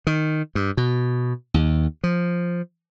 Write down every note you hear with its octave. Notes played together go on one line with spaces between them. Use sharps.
D#3
G2
B2
D#2
F3